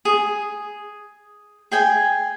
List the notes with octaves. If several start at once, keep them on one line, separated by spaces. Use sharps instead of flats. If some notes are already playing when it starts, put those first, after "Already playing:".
G#4
G#4 G5 G#5